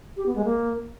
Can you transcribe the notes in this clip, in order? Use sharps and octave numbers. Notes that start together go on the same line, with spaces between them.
G4
B3
G#3
A#3